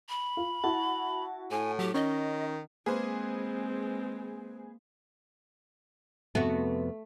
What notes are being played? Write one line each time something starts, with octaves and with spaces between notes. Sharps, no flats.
B5
F4
E4 F#4 A5
A2 G#5
F#3 G4
D#3 C#4 D#5
G#3 A#3 C4 G#4 B4 C5
F2 C3 A3 B3 F#4